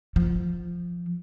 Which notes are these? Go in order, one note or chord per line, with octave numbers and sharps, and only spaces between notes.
F3